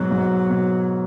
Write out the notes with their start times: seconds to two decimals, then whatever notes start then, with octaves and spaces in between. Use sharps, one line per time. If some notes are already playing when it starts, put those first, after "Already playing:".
Already playing: G#2 B2 F#3
0.11 G#2
0.50 B2